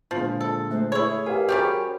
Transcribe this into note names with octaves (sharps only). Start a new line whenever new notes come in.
A#2 D3 F3 G#3
A4
A3 C5
E4 G#4 C#5
G4 A#4 B4 F5 G#5
G3 C#4 F#4 G4 A#4 C5